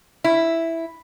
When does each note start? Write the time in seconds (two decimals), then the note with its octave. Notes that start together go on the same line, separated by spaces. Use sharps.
0.24 E4